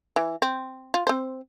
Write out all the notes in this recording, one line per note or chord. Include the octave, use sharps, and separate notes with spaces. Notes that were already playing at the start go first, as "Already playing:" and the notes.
E3
C4
F4
C4 C5